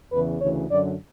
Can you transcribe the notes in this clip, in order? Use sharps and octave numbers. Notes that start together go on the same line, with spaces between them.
E2 C#3 E3 B4
D2 C#3 E3 C#5
F#2 D3 F#3 D5